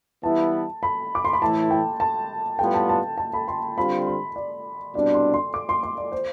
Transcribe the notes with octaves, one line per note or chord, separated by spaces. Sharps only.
E3 G3 B3 E4 A5
B5
D6
C6
B5
A2 E3 A3 E4 A5
G5
A5
A2 G3 B3 F4 B4 G5
A5
A5
A5
B5
C6
D3 G3 C4 F4 B5
C6
D5
C2 B2 G3 D4 D5
C6
C6
D6
C6
C6
D5
C5